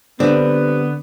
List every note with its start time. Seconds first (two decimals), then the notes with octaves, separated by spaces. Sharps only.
0.20 D3 G3 B3 C4 D4